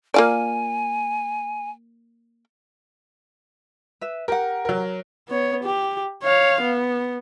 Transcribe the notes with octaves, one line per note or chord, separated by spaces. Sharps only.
A#3 F4 D5 G#5
B4 E5
G4 A#4 F#5
F#3 A#4
B3 C#5
G4
C#5 F5
B3